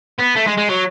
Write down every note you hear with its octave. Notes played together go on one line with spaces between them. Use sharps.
B3
A3
G#3
G#3
F#3